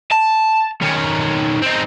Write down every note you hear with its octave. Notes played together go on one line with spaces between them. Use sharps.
A5
D#3 C#4
C4 D#4